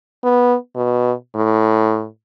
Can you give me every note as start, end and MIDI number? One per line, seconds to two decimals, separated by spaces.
0.24 0.56 59
0.75 1.12 47
1.35 2.07 45